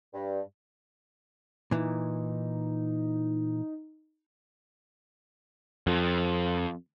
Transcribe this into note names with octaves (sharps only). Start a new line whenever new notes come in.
G2
A#2 E3 D#4
F2